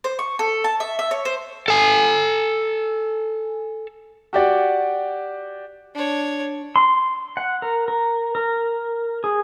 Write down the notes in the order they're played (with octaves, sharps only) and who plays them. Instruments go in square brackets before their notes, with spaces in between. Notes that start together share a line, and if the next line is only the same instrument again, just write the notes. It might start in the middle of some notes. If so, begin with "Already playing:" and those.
[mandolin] C5
C#6
A4
A5
E5
E5
C#5
C5
[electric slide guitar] A4 G#5
[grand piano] F#4 G4 D5 F#5
[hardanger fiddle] D4 C#5
[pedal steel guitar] C6
F#5
A#4
A#4
A#4
G#4